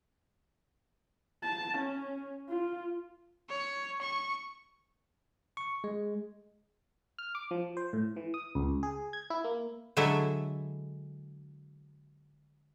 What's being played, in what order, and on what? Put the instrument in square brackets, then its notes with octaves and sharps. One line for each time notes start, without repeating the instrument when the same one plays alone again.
[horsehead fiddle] A5
C#4
F4
[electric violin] C#5
C#6
[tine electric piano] C#6
G#3
[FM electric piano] F6
D6
F3
C5
A2
E3
D#6
C#2
G#4
G#6
E4
A#3
[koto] D3 F#3 G#3 E4 A4 E5